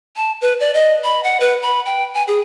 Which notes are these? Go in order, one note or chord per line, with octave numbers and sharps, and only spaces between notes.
A5
B4
D5
D#5
B5
F#5
B4
B5
G5
G#5
G#4